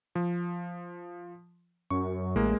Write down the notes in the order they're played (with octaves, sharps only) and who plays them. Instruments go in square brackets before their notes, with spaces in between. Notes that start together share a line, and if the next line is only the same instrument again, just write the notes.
[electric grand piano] F3
[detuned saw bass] F#2 [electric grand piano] C#6
[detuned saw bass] A1 [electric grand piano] G#3 A#3